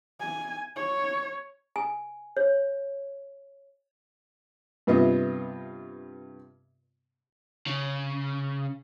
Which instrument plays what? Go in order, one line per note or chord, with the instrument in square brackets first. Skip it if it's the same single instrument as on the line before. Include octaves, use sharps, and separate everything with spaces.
[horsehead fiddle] G#5
C#5
[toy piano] G#5
C#5
[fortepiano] G2 C3 B3 F4 D#5 E5
[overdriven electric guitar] C#3